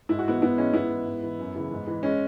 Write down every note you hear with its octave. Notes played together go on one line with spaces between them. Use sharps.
G#2 E4
F#4
E3 B3 E4
G#2 B3 E4
E3 G#3 C#4
G#2 B3 E4
E3
G#2
E3
F#2
C#3 E3
G#2
E3
G#3 C#4